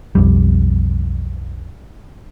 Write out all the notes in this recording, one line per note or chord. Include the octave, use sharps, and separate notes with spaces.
B1 F2 G3